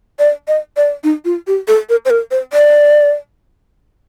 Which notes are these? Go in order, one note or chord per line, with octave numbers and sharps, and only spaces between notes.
D5
D#5
D5
D#4
F4
G4
A4
A#4
C5
A#4
C5
D5